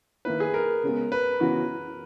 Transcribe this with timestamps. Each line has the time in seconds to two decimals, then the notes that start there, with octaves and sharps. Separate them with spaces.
0.25 D#3 A#3 E4 B4
0.40 G#4
0.54 A#4
0.83 C#3 G#3 B3
1.12 B4
1.40 C#3 E3 B3 F#4